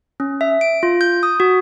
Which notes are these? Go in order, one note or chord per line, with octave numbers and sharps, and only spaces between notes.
C#4
E5
D7
F4
G6
D#6
F#4